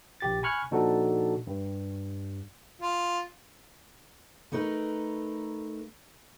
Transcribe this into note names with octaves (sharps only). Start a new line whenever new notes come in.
A#1 G4 A6
G#5 B5 C#6 F6 F#6 G#6
A#2 F3 D4 D#4 F#4 A4
G2
F4
A3 D#4 A#4 B4